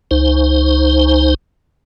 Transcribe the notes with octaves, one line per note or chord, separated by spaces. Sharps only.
C#2 D#4 C5